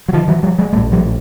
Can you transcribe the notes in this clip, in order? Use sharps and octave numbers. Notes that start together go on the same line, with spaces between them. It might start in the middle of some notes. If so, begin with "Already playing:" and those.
F#3
D#3 F3
E3 F#3
F3 G3
F#3 G#3
A#1 A2 G3 A3
F3 G3